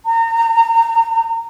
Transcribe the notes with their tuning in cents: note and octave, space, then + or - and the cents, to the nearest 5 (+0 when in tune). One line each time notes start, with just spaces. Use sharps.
A#5 -30